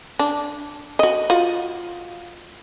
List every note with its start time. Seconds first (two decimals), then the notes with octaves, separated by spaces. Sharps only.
0.19 D4
0.99 F#4 D#5
1.30 F4 F#4